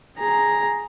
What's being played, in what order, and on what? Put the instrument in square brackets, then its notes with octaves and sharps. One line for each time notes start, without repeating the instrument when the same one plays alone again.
[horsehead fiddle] G#4 A#5